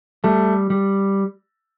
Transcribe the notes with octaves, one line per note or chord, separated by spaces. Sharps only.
G3 A3
G3